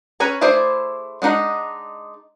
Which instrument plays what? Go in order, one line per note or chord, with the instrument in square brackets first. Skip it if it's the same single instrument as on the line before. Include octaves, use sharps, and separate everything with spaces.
[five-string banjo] C#4 B4 C#5 G#5 A#5
A3 E4 G#4 C5 D5
G#3 D4 D#4 F#5